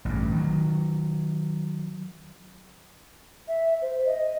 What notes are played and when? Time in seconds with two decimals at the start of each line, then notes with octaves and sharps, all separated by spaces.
0.05 A1 G2
0.32 D#3 F#3
3.48 E5
3.82 C5
4.05 D#5